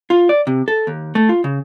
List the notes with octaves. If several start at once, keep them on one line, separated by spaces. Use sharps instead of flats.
F4
D5
C3
A4
D#2
A3
F4
C#3